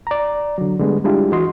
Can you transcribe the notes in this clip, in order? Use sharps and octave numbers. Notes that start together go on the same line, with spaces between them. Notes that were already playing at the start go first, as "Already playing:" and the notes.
D5 A#5
D3 F#3
D3 G3 G#3 B3
G3 G#3 D4 E4 F4 G4
E3 F#4 D#5 C6